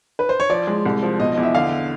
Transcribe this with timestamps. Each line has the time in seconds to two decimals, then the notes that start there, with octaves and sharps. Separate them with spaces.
0.19 B4
0.29 C5
0.40 C#5
0.50 F3 D5
0.67 G#3
0.86 C2
1.03 F3
1.19 B2 D#5
1.32 D#5
1.37 E2
1.43 E5
1.55 D3 F5